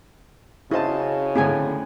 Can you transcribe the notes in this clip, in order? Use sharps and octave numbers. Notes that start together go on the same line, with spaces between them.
C#3 E4 F#4 C5 D#5 A5
A2 D3 C4 G#4 G#5